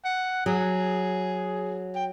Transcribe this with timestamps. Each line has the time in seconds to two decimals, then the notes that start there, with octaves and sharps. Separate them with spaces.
0.05 F#5
0.46 F#3 G#4
1.95 G5